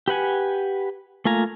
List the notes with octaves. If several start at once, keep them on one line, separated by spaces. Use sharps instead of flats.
G4 B4 F#5 G#5
A3 A#3 F4 G#5 A#5